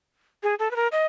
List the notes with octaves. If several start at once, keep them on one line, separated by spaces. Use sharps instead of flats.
G#4
A4
B4
A#4
D#5